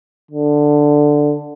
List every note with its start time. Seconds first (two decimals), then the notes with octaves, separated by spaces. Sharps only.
0.31 D3